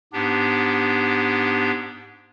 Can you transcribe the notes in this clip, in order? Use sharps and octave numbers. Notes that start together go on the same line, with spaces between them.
G#2 B3 D4 G4